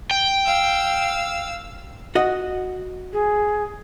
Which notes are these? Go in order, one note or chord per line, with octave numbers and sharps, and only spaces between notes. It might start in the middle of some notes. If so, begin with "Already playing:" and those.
G5
F5 E6
F#4 D#5
G#4